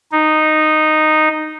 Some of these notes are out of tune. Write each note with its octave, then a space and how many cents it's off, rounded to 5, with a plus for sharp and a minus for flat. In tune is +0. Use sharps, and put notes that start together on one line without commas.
D#4 -10